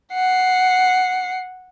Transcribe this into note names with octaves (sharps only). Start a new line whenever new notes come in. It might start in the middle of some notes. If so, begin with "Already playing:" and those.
F#5 C7